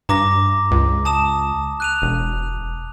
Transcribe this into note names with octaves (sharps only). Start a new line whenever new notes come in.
G2 A#5 D6 A#6
C#2
A5 D#6 E7
F#6 D#7 F7
E1